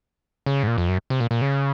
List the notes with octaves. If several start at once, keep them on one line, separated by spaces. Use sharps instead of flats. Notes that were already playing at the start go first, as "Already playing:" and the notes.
C#3
G#2
A#2
F2
F#2
C3
A#2
A#2
C#3